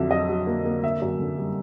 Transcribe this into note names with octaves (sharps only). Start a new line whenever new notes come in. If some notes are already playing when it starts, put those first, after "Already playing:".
Already playing: F2 D3 F#3 E5
F#3 D#5
F#3
A#3
A#3
D3 E5
F#2
D3
G3